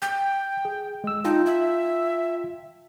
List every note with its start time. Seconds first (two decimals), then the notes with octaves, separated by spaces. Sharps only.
0.02 G5 G6
0.65 G#4
1.04 G#3 E6
1.25 D#4 F4 G5 A5
1.46 E5